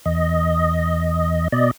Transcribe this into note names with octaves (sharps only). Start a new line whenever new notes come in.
E2 D#5
B2 D5 D#5